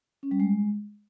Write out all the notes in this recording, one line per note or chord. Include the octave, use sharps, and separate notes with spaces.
C#4
G3
G#3